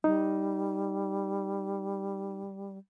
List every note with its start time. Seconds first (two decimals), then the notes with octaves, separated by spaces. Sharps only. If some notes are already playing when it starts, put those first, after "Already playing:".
0.04 G3 D#4